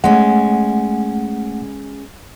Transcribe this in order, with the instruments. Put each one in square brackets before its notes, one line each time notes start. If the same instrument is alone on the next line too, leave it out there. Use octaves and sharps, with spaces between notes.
[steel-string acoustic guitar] G#3 C#4 [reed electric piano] A3 F#5